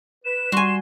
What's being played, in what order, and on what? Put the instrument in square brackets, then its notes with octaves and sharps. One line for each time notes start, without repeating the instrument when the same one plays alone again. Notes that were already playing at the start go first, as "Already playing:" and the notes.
[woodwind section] B4 [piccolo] E7
[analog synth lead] G3 [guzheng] F#4 G#5 [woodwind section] C6